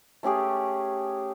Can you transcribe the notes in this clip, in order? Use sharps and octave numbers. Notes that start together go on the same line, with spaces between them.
A3 C#4 G4 G#4